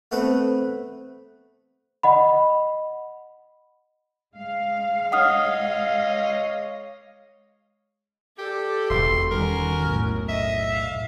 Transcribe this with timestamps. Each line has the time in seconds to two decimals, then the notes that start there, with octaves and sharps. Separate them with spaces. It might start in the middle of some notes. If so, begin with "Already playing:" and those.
0.12 A3 B3 C4 A4 B4
2.03 D#5 F#5 B5
4.35 G#3 F5
5.12 C#5 D#5 F#5 D#6 F6
8.38 G4 A4 D5
8.90 E1 C6
9.31 D#3 G3 C#4 F#4 A#4
9.86 B1 A2
10.28 D#5 E5
10.72 F5